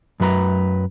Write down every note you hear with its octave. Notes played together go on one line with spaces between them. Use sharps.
F#2 F#3 B4 A#5